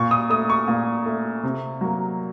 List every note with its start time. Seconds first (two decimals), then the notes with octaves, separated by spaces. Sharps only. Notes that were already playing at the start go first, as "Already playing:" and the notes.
Already playing: A#2 C#6
0.11 D#6
0.30 A3 D#6
0.50 C#6
0.68 A#2
1.06 A3
1.43 C3
1.81 F#3 A#3